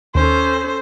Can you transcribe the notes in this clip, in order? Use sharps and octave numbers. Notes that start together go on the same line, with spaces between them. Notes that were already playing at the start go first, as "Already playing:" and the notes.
D#2 C#4 A4 C5